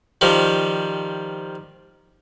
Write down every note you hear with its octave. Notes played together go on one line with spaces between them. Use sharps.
D#3 F3 G3